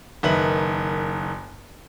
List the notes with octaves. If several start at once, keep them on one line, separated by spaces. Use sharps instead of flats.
F#1 D#3 B4 E5 F#7